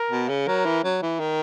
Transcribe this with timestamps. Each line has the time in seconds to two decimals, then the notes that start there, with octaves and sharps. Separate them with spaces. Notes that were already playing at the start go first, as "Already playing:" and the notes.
Already playing: A#4
0.11 B2
0.29 C#3
0.48 F#3 A#4
0.65 E3
0.84 F#3
1.02 E3
1.20 D#3